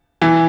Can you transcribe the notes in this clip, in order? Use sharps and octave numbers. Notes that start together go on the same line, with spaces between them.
E3